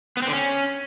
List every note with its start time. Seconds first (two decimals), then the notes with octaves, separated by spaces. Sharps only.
0.17 B3
0.22 C4
0.27 D3
0.33 C#4